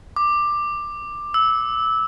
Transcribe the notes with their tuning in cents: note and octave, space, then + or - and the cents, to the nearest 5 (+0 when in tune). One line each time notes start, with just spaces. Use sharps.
D6 +10
E6 -20